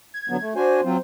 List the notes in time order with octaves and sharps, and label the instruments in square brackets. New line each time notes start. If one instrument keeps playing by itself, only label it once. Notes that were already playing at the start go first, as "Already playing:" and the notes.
[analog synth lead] G#6
[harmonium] D3 F#3 B3
A3
[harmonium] D4 F#4 G#5 [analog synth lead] C5
[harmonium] F#3 C4 F4